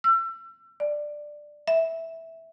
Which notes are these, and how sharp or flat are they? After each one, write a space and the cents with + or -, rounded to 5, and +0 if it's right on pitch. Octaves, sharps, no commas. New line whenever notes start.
E6 +35
D5 +10
E5 -10